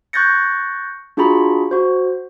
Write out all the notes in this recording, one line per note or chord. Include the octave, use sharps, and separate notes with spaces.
C#6 F#6 G6 A6 A#6 C#7
D4 F4 F#4 G#4 A#5 B5
F#4 C5